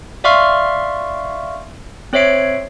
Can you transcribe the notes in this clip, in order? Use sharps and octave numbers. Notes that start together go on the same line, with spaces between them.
D5 E5 F5 C6 C#6 F6
C4 C5 C#5 E5 C7 D7